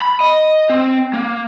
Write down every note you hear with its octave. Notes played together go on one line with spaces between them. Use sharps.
B5
D#5
C4
A#3